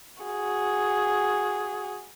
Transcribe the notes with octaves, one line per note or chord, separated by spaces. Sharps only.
F#4 G#4